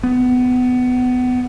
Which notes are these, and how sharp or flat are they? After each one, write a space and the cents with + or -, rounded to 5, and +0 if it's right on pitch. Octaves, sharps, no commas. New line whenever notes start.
B3 +20